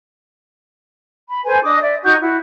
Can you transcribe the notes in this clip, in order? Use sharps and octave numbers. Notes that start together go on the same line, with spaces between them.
B5
A4 B4 C5 G#5
D4 D#5 D6 D#6
D5 E5
D#4 F#4 C#6 G6
E4 F#4